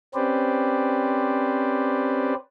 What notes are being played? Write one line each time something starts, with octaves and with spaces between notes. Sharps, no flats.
C4 C#4 G4 B4 C5 D5